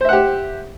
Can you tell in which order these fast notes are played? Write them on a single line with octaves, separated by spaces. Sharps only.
C5 E5 F#5 G4